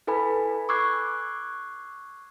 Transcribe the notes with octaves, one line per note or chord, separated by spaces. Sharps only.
E4 A4 B4 G#5 B5
C#6 D6 E6 F#6 G#6 C7